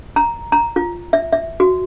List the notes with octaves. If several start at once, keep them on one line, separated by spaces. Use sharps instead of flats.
A#5
A#5
F4
E5
E5
F#4